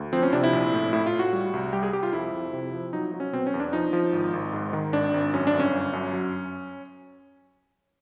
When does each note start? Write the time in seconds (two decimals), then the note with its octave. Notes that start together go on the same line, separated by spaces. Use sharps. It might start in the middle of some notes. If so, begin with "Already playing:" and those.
Already playing: D2
0.13 F3 C4
0.23 C#4
0.33 C3 D4
0.44 E4
0.53 A#1
0.73 A2
0.93 A2 E4
1.07 F4
1.13 A2
1.19 F#4
1.33 G3
1.53 C2
1.73 G3 G4
1.83 G#4
1.93 C2 G4
2.03 F4
2.13 F2 E4
2.33 F2
2.53 C3
2.73 F3
2.93 F#3 D#4
3.14 F#3
3.20 C#4
3.33 B2 C4
3.47 C#4
3.54 E2
3.60 D4
3.73 F3 D#4
3.93 F3
4.13 G#1
4.33 G#1
4.53 G#2
4.73 D#3
4.93 G#1 D4
5.14 G#1
5.33 F#2 C#4
5.47 D4
5.54 G1
5.60 C#4
5.73 G1
5.93 F#2
6.13 F#3